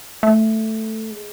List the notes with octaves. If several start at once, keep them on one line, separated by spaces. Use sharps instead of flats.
A3
G#3